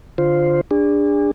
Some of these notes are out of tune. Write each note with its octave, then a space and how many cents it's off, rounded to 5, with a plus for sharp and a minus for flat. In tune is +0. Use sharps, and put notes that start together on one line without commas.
D3 +0 F4 +0 C5 +0
D4 +0 G#4 -35